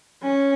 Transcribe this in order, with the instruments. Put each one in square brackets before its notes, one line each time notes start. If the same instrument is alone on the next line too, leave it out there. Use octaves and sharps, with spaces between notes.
[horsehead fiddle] C#4